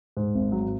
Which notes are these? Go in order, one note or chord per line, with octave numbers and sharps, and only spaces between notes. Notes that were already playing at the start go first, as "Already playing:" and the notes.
G#2
G#1
F#3